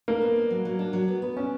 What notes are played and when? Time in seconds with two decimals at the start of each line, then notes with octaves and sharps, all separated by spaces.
0.08 A#3 D4
0.22 B3
0.36 D4
0.51 F#3
0.65 F#3
0.79 D4
0.93 F#3
1.08 B3
1.22 B3
1.37 C#4 D4